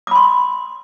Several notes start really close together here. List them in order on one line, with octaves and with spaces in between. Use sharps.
D6 B5 C6